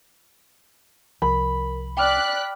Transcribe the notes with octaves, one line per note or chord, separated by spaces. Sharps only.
C2 F3 A#4 B5
D5 G5 D6 F6 F#6 B6